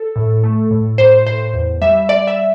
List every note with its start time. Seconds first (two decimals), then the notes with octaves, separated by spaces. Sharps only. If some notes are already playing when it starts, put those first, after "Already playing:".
Already playing: A4
0.16 A2
0.44 A3
0.71 A2
0.98 A2 C5
1.26 A2 C5
1.54 E2
1.82 G3 E5
2.09 G3 D5
2.27 E5